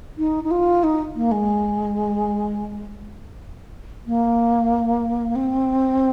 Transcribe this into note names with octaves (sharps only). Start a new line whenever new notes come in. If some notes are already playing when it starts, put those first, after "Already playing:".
D#4
D#4
F4
D#4
A#3
G#3
A#3
C4